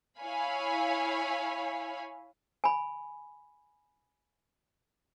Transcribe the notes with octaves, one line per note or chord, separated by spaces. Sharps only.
E4 C#5 F5 G#5 B5
G#5 B5